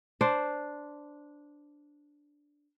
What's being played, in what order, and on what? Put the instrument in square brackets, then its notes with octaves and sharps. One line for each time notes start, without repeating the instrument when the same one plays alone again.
[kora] D4 C5 D5